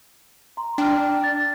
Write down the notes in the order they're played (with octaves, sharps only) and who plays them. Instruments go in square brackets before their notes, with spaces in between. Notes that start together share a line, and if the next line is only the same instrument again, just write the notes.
[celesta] A#5 C6
[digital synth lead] D4 [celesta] G5 F6
[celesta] A6